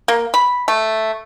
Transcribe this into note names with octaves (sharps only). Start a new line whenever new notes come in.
A#3
B5
A3